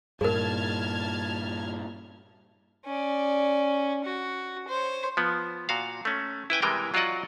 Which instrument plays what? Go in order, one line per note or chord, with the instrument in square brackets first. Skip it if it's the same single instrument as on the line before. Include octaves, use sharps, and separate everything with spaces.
[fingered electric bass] G2 A#2 [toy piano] G#4 A#4 [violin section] A5 F6 G#6
[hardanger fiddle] C#4 D5
F#4
C5 C#5
[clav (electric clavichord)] F3 B3
A#2 F#4 F5
A3 C#4
E4 B4 G5 G#5
C3 E3 G3 G#3 A#4 G5
F#3 F4 F#4 D5 D#5 F#5